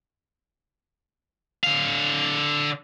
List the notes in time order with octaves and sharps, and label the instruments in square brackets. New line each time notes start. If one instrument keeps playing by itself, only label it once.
[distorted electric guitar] D3 F5